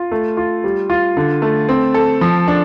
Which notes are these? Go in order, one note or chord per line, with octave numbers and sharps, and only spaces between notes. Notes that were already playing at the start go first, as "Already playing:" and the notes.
Already playing: F4
A3
F4
G3
F4
D3
A3
C4
A4
F3
D4